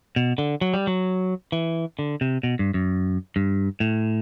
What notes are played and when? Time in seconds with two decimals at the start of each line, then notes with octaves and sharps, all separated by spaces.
0.16 B2
0.38 D3
0.61 F#3
0.74 G3
0.87 F#3
1.52 E3
1.99 D3
2.21 C3
2.43 B2
2.59 G2
2.74 F#2
3.36 G2
3.80 A2